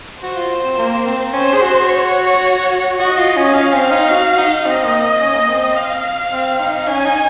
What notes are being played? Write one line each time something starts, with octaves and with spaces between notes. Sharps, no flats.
F#4 C5
F4
C4
A#3
C4
C#4 C5
G#4
F#4
C#5
F#4 D#5
F4
C#4
C#4 F5
C4
D#4
F#4
D#4
C4 D#5
A#3
C#4
A#3
C4
C4
F5
C4
D#4
C#4 G#5
D#4